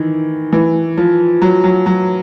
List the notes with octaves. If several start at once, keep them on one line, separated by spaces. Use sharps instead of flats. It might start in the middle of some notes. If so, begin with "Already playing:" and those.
Already playing: D#3 E3
E3
F3
F#3
F#3
F#3